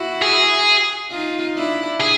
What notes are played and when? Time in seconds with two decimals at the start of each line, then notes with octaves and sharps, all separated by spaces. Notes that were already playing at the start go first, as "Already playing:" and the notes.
Already playing: E4 F#4
0.22 G#4
1.11 D#4 F4
1.55 D4 E4
2.00 G#4